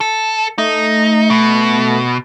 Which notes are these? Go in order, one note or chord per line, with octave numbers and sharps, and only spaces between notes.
A4
A3 D#4
B2